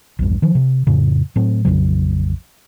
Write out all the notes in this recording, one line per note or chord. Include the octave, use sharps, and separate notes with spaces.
A#1 E2 G2
D#3 F3
C3
F2 A2 C#3
A2 F#3 A3 C4
A#1 F2 C#3 F#3